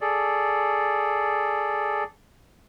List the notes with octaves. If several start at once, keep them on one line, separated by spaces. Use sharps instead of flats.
G#4 A4 D5